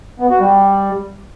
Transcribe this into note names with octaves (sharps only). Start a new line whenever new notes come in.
B3
F#4
G3